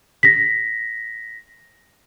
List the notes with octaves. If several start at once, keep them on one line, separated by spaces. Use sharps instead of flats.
A#6 B6